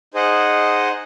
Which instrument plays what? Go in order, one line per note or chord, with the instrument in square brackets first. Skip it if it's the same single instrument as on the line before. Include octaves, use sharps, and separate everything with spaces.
[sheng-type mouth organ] D#4 G#4 C5 D#5 F#5